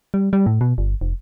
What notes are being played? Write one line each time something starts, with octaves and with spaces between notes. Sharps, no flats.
G3
G3
A2
B2
G1
F1